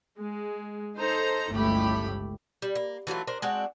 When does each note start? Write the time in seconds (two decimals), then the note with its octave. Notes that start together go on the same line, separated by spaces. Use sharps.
0.19 G#3
0.96 D#4 A4 C5 A#5
1.51 G1 C#2 A2 A3 G4 B5
2.62 G3
2.75 A#3
3.07 E3 F#3 A3 F4
3.27 D4 A#4 C5
3.42 G#3 C4 D4 F#4